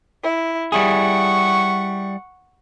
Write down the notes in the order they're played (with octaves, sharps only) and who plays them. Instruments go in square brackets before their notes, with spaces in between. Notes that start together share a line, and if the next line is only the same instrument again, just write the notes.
[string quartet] E4
[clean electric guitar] G3 E4 G#4 [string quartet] F#5 C#6